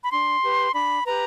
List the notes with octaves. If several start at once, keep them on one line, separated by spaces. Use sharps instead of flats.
B5
D4 C6
G4 B4
D4 B5
G4 B4 A#5